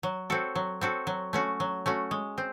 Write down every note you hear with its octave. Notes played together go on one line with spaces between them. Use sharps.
F#3
C4 F#4 A4
F#3
C4 F#4 A4
F#3
A3 C#4 F#4
F#3
A3 C#4 F#4
G#3
C4